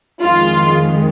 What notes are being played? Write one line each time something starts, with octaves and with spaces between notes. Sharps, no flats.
F2 D#3 G#3 F4